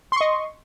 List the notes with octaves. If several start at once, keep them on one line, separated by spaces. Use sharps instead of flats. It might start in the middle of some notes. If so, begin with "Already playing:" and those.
D#5 C6 C#6